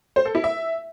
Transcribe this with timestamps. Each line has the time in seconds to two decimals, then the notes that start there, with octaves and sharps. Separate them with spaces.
0.16 C5
0.25 A4
0.35 E4
0.44 E5